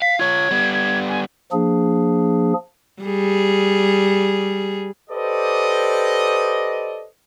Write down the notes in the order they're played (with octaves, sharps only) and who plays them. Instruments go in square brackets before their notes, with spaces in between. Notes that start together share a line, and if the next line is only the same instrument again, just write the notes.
[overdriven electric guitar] F5 [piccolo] B6
[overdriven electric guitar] F4 C#5 [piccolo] G#6
[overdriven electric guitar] G3 B3
[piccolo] G#6
G#5
[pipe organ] F3 A#3 D4 G#4
[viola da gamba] G3 G#4
[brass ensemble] G4 A4 B4 C5 D5 D#5